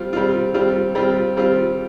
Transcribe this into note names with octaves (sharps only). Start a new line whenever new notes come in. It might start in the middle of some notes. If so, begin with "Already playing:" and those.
Already playing: G3 C4 F4
G3 C4 F4
G3 C4 F4
G3 C4 F4
G3 C4 F4